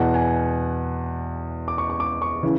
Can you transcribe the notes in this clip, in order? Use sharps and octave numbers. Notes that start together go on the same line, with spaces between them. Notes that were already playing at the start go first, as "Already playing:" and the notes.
Already playing: E2 B2 F#5
G#5
D6
C#6
C#6
D6
C#6
C#3 E3